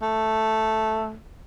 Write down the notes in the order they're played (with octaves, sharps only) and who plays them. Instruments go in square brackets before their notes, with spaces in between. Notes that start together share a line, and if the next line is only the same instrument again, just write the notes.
[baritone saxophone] A3